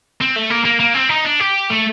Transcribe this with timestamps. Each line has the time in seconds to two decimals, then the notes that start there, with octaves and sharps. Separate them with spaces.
0.21 C4
0.36 A3
0.50 A#3
0.65 A#3
0.80 A#3
0.95 C4
1.10 D#4
1.25 D4
1.40 G4
1.70 A3